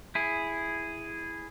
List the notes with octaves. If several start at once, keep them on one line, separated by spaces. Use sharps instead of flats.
E4 G#4